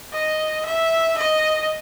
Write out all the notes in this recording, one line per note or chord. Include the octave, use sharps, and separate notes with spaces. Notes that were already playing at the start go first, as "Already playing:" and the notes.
D#5
E5
D#5